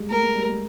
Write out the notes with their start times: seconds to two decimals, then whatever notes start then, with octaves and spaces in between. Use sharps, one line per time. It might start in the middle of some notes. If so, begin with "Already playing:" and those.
Already playing: G3 G#3
0.10 A3 A#4
0.23 G#3
0.36 G3
0.49 G#3